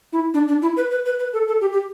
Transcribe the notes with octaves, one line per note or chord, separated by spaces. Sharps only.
E4
D4
D4
E4
B4
B4
B4
B4
A4
A4
G4
G4